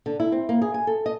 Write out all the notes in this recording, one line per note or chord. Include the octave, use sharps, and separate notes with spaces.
D3
E4
C4
A#3
G#4
G#5
A4
D#5